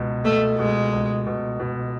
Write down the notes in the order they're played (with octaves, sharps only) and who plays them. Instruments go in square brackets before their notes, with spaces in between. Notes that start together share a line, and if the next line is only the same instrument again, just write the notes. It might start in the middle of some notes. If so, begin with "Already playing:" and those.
Already playing: [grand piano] C#2 B2
[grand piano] B2 [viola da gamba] A3
[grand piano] B2 [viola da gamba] G#3
[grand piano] C#2
B2
B2